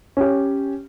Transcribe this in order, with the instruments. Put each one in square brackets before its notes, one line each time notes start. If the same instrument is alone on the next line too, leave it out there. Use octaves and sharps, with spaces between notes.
[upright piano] C#4 G4